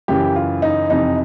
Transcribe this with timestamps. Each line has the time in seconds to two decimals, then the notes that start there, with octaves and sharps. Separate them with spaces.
0.08 F#2 C#3 E3 G4
0.36 F4
0.62 D#4
0.90 F2 C3 E3 D#4